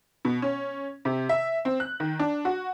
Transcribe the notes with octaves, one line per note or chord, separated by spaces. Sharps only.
B2
C#4
C3
E5
C4
F#6
D#3
D4
F#4